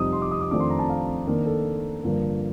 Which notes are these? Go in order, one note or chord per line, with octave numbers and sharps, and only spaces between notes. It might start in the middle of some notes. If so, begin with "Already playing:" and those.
Already playing: F2 C3 G3 C4 D#4 D#6
C6
D6
D#6
D6
F2 D#3 A3 D4 D6
C6
A#5
A5
F5
D#3 A#3 D4 A#4
A4
G2 D3 F3 A#3 D4 A#4